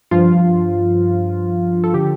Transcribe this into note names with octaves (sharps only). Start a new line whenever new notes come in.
G2 F3 F4
A4
D3 F3 G4